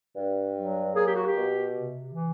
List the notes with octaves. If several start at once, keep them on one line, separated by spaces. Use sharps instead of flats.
G2
F#3
A#3 G#4
G4
F#4
G4
B2
C3
E3